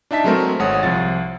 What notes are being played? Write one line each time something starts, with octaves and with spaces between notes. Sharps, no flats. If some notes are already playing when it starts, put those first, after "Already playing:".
D4 D#4 E5 A5 B6
F#3 G#3 A3 C4 A#4
G#1 G#3 C#5 F#5 D#6
C2 F3 A6